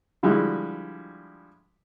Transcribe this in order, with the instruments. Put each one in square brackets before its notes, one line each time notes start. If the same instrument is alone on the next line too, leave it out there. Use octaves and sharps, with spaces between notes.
[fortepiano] D3 F3 G3 G#3 E4 F#4